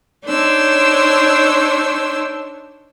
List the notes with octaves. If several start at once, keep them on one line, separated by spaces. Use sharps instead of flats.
D4 D#4 C5 C#5 E6